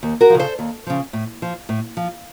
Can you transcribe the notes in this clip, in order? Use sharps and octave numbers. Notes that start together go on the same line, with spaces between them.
D#2
F#4 A#4
C#3 F3
A4 C5
D#2
C#3 F3
A2
F3
A2
F3